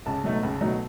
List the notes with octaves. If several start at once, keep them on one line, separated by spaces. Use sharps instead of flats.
C#2 A5
B2 F#3 A3 D#4
C#2
B2 F#3 A3 D#4